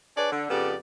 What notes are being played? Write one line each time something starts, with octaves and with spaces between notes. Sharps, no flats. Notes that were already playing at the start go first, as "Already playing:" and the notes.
D4 G#4 B4 C#5 D5
D3
F2 C#3 B3 G4 A4 D5